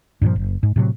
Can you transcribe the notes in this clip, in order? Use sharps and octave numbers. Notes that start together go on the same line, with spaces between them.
G2 A#2 C#3 F3
F#1
G#2
A2 C3 F#3